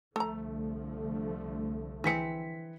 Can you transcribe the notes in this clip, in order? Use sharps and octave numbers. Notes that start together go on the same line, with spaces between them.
C2 D3 F3 A3 A4 A#5
E3 C4 G#4 B6 C#7